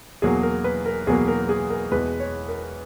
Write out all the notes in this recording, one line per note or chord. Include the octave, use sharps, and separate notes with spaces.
E2 B2 F#3 A#3 G#4
A#4
B4
A#4
E2 B2 F#3 A#3 G#4
A#4
G#4
A#4
E2 B2 G#3 B4
C#5
A#4